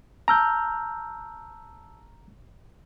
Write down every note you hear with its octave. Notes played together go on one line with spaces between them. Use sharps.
A5 A#5 E6 F6 G6